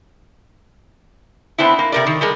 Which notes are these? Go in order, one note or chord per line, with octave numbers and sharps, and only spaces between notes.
B3 C4 D4 E4
A#3
C3 A#4 D5
D#3
G3 G#3 A#4